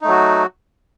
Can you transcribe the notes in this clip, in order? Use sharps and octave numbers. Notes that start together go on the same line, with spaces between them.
F#3 A3 D#4 F#4